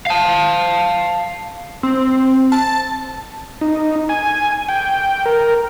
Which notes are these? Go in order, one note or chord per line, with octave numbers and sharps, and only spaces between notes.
F5 A5
C4
A5
D#4
G#5
G5
A#4